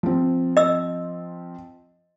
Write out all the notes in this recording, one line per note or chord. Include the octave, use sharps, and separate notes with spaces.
F3 C4
D#5 E6